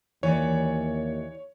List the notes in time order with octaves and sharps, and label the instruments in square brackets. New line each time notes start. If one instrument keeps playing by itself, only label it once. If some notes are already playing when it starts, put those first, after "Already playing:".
[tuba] D#2 [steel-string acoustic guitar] E3 D5 [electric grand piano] C#5